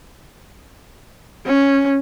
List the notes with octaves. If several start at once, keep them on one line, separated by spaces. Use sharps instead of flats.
C#4